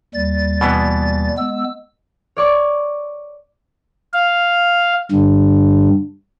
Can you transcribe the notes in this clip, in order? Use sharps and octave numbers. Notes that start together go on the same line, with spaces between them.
D#2 G3 A6
B2 E3 B3
G#3 B3 E6
C#5 D5 C#6
F5
G2 D3